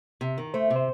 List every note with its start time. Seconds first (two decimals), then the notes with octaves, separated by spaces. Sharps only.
0.21 C3
0.38 D#3
0.54 A3 C5
0.70 C3
0.76 C5